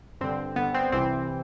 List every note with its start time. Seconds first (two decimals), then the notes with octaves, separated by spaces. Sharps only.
0.21 G2 D3 C4
0.56 G2 D3 B3
0.74 C4
0.92 C2 C3 E3 C4